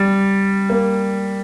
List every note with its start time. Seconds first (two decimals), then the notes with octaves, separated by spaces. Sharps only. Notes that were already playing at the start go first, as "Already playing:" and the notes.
Already playing: G3
0.70 A#3